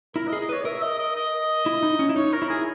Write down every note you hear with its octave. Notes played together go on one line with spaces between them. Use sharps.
E4 A#4
D#5
G#4
D#5
B4 C#5
A#4 E5
D#5
D#5
D#5
E4
D#4
C#4
E4
D#4 C#5
A#4
E4
G#4